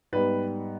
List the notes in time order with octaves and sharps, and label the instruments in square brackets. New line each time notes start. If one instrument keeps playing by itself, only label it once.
[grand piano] G#2 G3 B3 B4